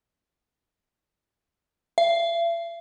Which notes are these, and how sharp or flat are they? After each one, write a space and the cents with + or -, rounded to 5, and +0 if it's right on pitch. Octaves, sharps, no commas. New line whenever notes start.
E5 +45